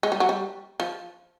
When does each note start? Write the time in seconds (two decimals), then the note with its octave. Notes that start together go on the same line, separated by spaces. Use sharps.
0.03 G#3
0.12 G3
0.20 F#3
0.29 G3
0.80 F3